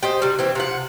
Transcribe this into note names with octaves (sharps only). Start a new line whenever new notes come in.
G4 C5 D#5
C3 G3
E3 C4
C3 F3 F#5